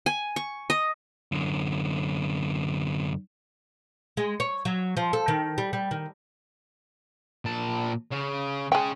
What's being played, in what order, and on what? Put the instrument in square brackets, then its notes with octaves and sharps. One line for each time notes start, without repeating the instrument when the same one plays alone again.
[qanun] G#5
C#6
D#5
[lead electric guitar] F#2 D3
[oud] G#3
C#5
F#3
F3
A4
D#3
G3
G3
D#3
[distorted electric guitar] A#2 A5
C#3
[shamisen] G#3 G5 [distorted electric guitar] C#4 G#4